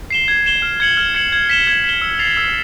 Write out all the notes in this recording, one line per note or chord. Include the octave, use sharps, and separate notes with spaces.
C7 E7 G7
G#6
C7 E7 G7
F6
G#6 C#7 F#7
F6
G#6 C#7 F#7
G#6
B6 E7 G7
G#6
B6 E7 G7
E6
A6 C7 F7
E6